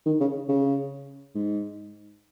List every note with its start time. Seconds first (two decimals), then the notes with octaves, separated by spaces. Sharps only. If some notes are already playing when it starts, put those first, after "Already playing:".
0.06 D#3
0.20 C#3
0.49 C#3
1.35 G#2